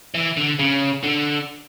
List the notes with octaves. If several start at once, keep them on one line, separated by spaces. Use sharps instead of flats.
E3
D3
C#3
D3